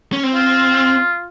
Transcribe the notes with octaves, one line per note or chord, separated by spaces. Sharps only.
C#4
C4
F4